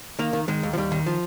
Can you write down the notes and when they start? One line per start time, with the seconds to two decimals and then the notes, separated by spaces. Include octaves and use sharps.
0.19 D#3 A#3
0.33 D#3
0.48 D#3 G#3
0.63 D#2
0.73 F3
0.78 D#2 G3
0.92 D#3
1.06 F3